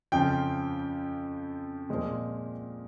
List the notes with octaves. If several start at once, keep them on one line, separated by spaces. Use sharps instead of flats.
F2 C#3 F3 C4 G5
A#2 F3 G#3 C4